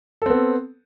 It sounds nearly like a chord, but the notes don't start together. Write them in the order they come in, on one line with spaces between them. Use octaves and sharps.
A4 C4 B3